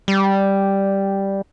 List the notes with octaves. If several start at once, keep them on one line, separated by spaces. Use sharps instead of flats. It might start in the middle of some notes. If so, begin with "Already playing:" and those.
G3